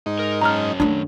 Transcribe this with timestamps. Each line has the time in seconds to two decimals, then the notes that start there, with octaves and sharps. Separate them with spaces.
0.06 G#2 D#4
0.19 A#4
0.42 F#2 C#4 A5 A#5 F6
0.80 D#3 A3 D4